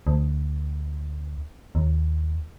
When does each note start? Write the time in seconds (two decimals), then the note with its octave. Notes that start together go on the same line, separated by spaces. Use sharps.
0.07 D2
1.75 D#2